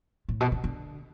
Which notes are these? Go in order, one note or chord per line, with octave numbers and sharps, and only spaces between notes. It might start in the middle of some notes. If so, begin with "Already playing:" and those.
A2
B2
C#3
D3